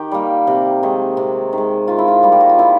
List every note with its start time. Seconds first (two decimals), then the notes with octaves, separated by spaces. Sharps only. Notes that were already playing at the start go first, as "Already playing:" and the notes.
Already playing: D#3 G4
0.11 G3 A#3
0.47 C3
0.83 D#3 G#3
1.17 C3
1.53 D#3 G#3
1.88 D#3 F4
1.99 E4
2.08 F4
2.23 G3 A#3
2.32 G4
2.40 F#4
2.49 F4
2.59 D#3 E4